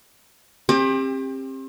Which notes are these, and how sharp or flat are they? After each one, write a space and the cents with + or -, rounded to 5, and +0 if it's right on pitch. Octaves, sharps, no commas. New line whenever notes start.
C4 +35 G4 +25